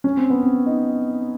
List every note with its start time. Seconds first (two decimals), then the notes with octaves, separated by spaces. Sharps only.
0.04 C#4
0.17 C4
0.30 B3
0.43 C4
0.66 D#4